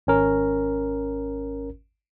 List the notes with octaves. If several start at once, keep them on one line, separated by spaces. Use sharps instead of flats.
G#1 C#4 A#4